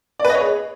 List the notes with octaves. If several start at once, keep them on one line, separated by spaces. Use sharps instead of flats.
D5
B4
D#5
C#5
G#4